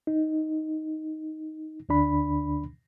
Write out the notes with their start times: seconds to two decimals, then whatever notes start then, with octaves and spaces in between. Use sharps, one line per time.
0.07 D#4
1.89 D2 D3 D4 B5